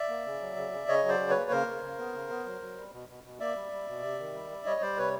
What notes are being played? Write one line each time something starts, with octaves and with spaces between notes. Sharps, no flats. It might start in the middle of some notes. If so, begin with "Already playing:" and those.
Already playing: D5 E5
A#3
C#3
F#3
C#3
C#3
C#3 C#5 D#5
F#3
C5 D5
C#3
B4 C#5
A#3
C#3 A#4 C5
C#3
C#3
B3
C#3
B3
F#3
F#3
G3
B2
B2
B2
A#3 D5 E5
G3
G3
B2
C3
D#3
G3
G3
G3 C#5 D#5
G3 C5 D5
C3 B4 C#5